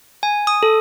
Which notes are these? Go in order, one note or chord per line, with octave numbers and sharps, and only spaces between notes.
G#5
D#6
A4